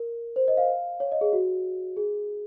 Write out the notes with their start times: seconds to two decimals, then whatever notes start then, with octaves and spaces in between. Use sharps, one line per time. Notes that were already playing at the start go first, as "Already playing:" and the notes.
Already playing: A#4
0.36 C5
0.48 D#5
0.57 F5
1.00 C#5
1.12 D#5
1.21 G#4
1.33 F#4
1.97 G#4